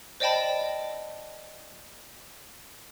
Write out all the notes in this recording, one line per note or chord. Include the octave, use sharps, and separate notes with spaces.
C5 D5 D#5 G5 A5 B5